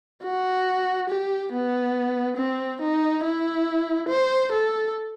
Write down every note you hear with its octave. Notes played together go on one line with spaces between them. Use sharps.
F#4
G4
B3
C4
D#4
E4
C5
A4